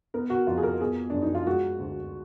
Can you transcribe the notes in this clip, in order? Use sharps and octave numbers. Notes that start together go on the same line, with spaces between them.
B3 A#4
F#4
F2 F4
G#4
A#4
B3 G#4
F#2 D4
D#4
F4
G#3 F#4
D2